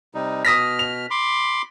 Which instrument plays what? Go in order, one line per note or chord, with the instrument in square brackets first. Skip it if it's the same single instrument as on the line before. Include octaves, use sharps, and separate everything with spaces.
[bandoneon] C3 G3 D#4
[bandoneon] B2 F6 [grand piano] D#6 A#6 B6
[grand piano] F7
[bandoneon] B5 C6 D6